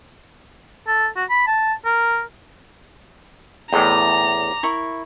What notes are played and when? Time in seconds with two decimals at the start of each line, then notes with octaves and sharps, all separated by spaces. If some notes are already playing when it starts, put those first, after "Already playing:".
0.87 A4
1.16 F#4
1.30 B5
1.47 A5
1.85 A#4
3.73 E2 A2 D5 D#5 G5 A#5
4.63 E4 A#4 C#6